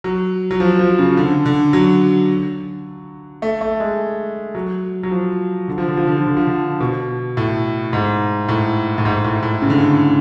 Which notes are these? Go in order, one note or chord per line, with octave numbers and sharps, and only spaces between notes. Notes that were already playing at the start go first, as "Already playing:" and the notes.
F#3
F#3
F3
F3
C#3
D3
D3
F#3
A3
A3
G#3
F#3
F#3
F3
D3
F3
D3
F3
D3
F3
D3
F3
D3
B2
A2
G#2
A2
A2
G#2
A2
A2
C#3
D3
C#3